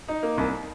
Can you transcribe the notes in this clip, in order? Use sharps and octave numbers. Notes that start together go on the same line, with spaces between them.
D#4
A#3
C2